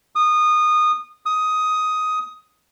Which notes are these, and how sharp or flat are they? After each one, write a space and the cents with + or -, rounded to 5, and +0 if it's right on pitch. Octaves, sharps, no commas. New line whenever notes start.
D#6 -20
D#6 +10